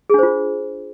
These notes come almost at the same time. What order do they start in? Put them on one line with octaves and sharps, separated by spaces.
G#4 D4 C5 F4